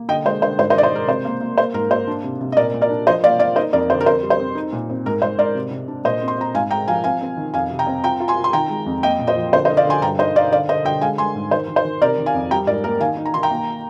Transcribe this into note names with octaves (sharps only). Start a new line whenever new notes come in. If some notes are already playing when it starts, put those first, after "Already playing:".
Already playing: A#3
D3 D#5 G5
G#3 C5
D3 C5
G#2 C5
C5 D#5
D#3 D5
C5
G#3 A#4
C3 C5
A#3
A#3
A#3 C5
G#2 A#4
A#3 C5
D4
C3
C3
D#5
A#2 A#4 D5
A#2
A#4 D5
D4
F3 C5 D#5
A#3 D5 F5
A#3 D5 F5
D#4 C5 D#5
F2 A#4 D5
D3 C5
A#4
F2 C5
G3
C5
C4
D#4
A#2
C4
G#2 A#4
G#2 C5
G#2 A#4 D5
C3
C3
D4
A#2 C5 D#5
C4
C6
C4 A#5
G#2 F5 G#5
G#3 G5 A#5
F3 F5 G#5
C4 F5 G#5
C4
D#3
F2 F5 G#5
C3
G5 A#5
C4
F4 G5 A#5
F4
G#5 C6
F4
C6
D#3 G5 A#5
G#3
F2
A#3 D#5 G5
A#2
C5 D#5
F3
D3 C5
C5 D#5
D3
D5 F5
D3 G#5 C6
G2 G5 A#5
D#4 C5 D#5
D#4 D5 F5
D3 D5 F5
D3 C5 D#5
D3 D#5 G5
G#3 F5 G#5
G#3 G#5 C6
G#2
D#3 C5
D#3
C5
D#3
C3 A#4 D5
D#3
F5 G#5
F2
G3 G5 A#5
G#2 A#4 D5
A#3 A#4
D#3 F5 G#5
D#4
A#5
D#3 C6
G5 A#5
A#3